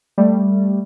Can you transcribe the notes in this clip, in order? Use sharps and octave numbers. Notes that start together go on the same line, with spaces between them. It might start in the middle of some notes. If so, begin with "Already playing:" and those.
G3 A3